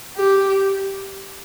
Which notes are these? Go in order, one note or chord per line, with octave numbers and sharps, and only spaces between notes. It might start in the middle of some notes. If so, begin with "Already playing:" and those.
G4